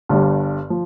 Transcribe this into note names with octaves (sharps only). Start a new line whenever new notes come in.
G1 G2 G3
F3